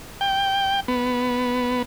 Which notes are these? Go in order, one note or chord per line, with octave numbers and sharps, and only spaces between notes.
G5
B3